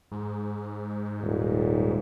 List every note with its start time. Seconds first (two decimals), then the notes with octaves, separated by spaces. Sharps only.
0.12 G#2
1.22 D#1